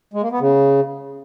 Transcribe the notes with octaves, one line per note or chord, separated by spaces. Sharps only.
G#3
A#3
B3
C#3